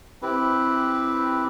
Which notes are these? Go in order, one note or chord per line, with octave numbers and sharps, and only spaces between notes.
C4 E4 G4 B4